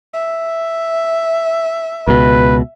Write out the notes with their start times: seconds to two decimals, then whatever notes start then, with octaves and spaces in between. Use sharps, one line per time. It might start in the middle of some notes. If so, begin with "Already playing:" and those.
0.14 E5
2.08 C#2 B2 B4